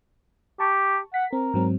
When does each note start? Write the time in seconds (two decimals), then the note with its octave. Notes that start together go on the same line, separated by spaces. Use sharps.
0.60 G4 A5 C#6
1.14 F#5 B6
1.33 C4 A#4
1.54 G#2 F#3 C4